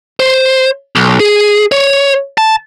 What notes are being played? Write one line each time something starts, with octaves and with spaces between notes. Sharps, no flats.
C5
B1
G#4
C#5
A5